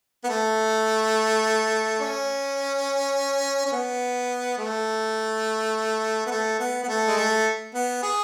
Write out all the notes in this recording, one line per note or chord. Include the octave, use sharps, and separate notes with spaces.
B3
A3
C#4
C#4
B3
A3
B3
A3
B3
B3
A3
G#3
A3
B3
G#4